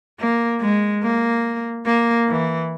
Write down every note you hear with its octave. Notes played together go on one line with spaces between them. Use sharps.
A#3
G#3
A#3
A#3
E3